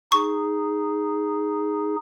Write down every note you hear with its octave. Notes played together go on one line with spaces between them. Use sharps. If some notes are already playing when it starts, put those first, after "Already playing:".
D#4 G#4 C#6